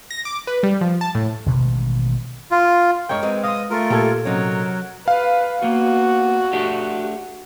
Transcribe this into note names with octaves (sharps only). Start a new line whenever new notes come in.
A#6
D6
B4
G3
F3
A5
A2
A1 B2 D#3 G#3
F4
G2 G#3 A#4 C#5 G5
G#3 B3 C4
D#5 F5 C6 D#6
A3 F4 A#4
A#2 G4 A4 G#6
C3 F#3 C#4 D#4 A#4 C#5
B4 F5
A#3 B3 F#4
A3 D4 G4